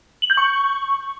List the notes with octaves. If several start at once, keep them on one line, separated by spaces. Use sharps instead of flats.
F#7
G6
C#6